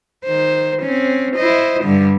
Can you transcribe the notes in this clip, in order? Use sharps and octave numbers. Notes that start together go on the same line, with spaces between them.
D#3 C5
C4 C#4
E4 C5 D#5
G2 D3 G3